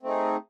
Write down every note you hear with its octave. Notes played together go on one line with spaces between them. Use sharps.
A3 C4 D#4 G#4